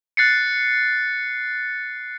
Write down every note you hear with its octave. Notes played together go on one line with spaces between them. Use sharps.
F#6 A6 C7 C#7